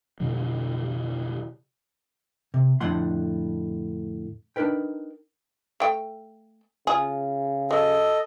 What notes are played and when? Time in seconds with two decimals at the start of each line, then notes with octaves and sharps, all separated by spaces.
0.20 F2 B2 D3 F#3
2.54 C3
2.80 F2 A2 D3 A3 F#5 C6
4.56 D4 D#4 A#4 B4 G5
5.80 A3 G5
6.87 C#3 F4 G#4
7.71 F#3 A4 D#5